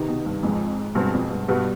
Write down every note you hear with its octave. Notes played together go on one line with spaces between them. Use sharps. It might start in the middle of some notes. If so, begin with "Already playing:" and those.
Already playing: C3 D#3 B3 D#4
B2
G2
F2 G#2 F3 G#3
G2 B2 G#3 C4
F2
G2
G2 B2 G3 B3